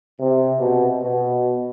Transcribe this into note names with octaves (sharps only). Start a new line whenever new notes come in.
C3
B2
B2